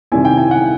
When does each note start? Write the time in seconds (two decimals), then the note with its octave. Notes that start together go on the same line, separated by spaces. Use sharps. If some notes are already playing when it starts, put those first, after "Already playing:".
0.12 C3 D#3 G3 C4 E4 G#5
0.25 G5
0.38 G#5
0.51 F#5